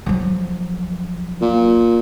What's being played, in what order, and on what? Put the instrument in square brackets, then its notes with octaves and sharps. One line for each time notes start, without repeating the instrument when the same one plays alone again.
[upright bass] F3 F#3
[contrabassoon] A#2